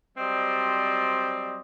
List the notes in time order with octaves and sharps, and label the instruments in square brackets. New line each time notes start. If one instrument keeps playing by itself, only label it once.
[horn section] F#3 G3 C4 C5 D5 D#5